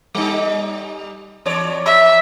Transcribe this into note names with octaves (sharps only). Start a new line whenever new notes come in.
G3 D#4
E2 C#5 D5
E5